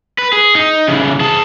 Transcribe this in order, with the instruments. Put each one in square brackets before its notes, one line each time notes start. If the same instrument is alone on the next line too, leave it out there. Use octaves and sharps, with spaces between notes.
[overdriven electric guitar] B4
G#4
D#4
C#3 E3
G#4 A5